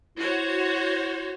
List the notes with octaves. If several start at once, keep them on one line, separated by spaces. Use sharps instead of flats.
E4 F#4 C5 C#5